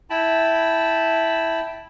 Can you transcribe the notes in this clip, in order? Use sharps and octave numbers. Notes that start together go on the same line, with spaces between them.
E4 G5 A5 B5